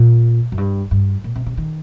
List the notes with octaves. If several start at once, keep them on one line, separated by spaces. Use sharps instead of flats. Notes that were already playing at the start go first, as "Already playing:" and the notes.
Already playing: A#2
F#2
G2
G2
A#2
C3
C3
D#3